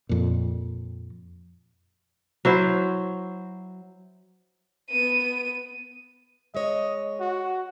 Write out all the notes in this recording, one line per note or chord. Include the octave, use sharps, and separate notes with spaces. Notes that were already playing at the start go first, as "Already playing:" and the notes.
F2 A#2
F#3 E4 C5
B3 D#7
G#3 C#5 D#5
F#4